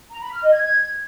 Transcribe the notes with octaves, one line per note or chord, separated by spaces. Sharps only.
A#5
B5
F6
D#5
G#6